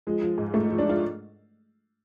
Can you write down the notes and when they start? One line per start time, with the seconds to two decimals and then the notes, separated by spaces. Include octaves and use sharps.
0.07 F3 G#3
0.22 F3
0.38 G#2
0.54 G#2 A3
0.70 F3
0.78 D4
0.85 F3 F4